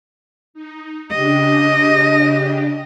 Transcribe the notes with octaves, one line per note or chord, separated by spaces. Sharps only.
D#4
C#3 D4 G4 D#5